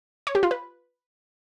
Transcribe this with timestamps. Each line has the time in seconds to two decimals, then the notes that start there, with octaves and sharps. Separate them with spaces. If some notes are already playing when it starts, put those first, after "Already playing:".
0.27 C#5
0.35 G4
0.43 F4
0.51 B4